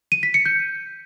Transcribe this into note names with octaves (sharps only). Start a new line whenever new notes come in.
D#7
B6
C#7
G6